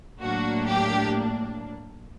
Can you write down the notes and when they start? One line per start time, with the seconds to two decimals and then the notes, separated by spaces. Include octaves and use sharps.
0.20 A2 F#3 A#3 D4 F#4
0.67 G4